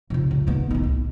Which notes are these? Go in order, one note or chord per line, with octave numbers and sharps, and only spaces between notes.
F1 C#2
C#2
D#3 B3
A1 D#3
C2